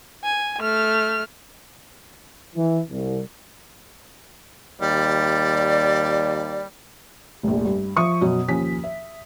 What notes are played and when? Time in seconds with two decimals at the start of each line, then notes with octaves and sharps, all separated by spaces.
0.24 G#5
0.60 A3 F6
2.56 E3
2.90 C2
4.81 D#2 G3 D5
7.43 F1 A#1
7.65 G2
7.96 F3 E5 C#6 D#6
8.21 F#2 B2
8.48 D#2 F3 C#4 B6
8.84 E5